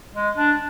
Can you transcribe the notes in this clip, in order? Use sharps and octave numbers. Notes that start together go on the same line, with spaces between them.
G#3
D4